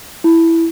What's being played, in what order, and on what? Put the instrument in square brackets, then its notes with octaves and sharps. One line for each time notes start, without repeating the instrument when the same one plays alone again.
[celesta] E4